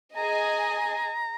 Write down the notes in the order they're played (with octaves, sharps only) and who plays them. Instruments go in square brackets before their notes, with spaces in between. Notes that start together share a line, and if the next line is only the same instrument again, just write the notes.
[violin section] G#4 D#5 G#5 [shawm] A#5